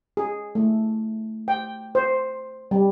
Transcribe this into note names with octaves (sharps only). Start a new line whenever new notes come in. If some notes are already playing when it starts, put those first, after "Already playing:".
G#4
A3
G5
C5
G3